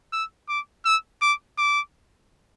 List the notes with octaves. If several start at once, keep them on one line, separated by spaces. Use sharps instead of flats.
E6
D6
E6
D6
D6